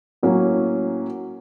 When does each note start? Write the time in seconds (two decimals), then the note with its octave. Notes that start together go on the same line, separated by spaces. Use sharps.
0.23 A2 F#3 A#3 C#4